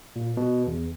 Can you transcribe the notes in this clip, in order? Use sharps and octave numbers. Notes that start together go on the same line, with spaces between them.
A#2
B2
E2